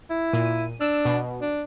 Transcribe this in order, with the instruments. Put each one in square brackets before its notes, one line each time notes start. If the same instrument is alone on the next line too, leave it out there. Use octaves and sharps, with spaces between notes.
[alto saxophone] E4
[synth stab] A#2 D#7
[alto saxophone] D4 [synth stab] E6
[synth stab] B2
[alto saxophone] D4